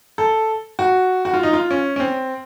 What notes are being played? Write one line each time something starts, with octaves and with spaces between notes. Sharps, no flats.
A4
F#4
F#4
F4
D#4
F4
C#4
C#4
C4